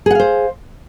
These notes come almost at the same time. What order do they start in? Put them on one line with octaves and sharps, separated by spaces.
G#4 F#5 F5 C5